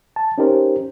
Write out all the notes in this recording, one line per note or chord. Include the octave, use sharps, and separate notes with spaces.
A5
C#4 D#4 G4 A#4 C5